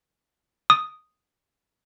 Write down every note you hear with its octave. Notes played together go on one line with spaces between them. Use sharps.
D#6